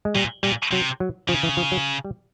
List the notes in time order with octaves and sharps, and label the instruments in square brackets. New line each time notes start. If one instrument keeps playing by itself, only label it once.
[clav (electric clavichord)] G#3
[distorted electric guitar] A#2 [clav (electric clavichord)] G3
[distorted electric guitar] A#2 [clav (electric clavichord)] G3
[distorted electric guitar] C3 [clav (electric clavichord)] F#3
[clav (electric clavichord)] F#3
[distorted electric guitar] C#3 [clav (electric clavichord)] F3
[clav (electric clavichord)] E3
F3
F#3
G3